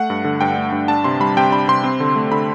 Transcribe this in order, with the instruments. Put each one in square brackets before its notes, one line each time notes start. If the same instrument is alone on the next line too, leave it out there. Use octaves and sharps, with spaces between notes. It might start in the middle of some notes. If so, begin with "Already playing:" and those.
Already playing: [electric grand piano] A3 F#5
G2
D3
G2 G5
A3
G2
D4 A5
C3 C6
G3 B5
C3 G5
D4 B5
C3 C6
C4
D3
A3
D3 B5